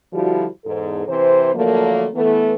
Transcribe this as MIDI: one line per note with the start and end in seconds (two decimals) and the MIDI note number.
0.13 0.45 50
0.13 0.45 53
0.13 0.45 55
0.13 0.45 64
0.13 0.45 66
0.65 1.04 40
0.65 1.04 44
0.65 1.04 69
1.08 1.51 48
1.08 1.51 52
1.08 1.51 60
1.08 1.51 72
1.55 2.07 50
1.55 2.07 53
1.55 2.07 54
1.55 2.07 57
1.55 2.07 58
2.15 2.55 52
2.15 2.55 57
2.15 2.55 59